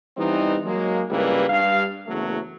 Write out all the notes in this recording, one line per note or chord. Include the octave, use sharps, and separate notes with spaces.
E3 G3 B3 C4 D#4
F#3 G#3 A#3
C#2 G2 E3 G3 A#3 B4
G2 F5
F#1 E2 F#3 A3